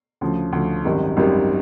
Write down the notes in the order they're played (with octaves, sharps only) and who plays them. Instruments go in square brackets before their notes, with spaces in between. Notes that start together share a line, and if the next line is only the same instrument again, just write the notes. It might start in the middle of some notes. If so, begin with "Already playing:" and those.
[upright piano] D2 C#3 F3
D2 C#3 F3
G#1 F#2 D#3 G3
G#1 F#2 D#3 G3